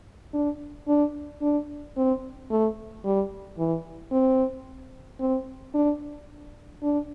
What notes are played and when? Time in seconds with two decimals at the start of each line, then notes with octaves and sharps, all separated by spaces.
0.33 D4
0.88 D4
1.41 D4
1.97 C4
2.51 A3
3.05 G3
3.58 E3
4.12 C4
5.20 C4
5.74 D4
6.83 D4